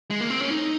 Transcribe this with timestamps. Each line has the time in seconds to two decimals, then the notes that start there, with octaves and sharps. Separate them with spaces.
0.11 G#3
0.21 A#3
0.30 C4
0.41 C#4
0.51 D#4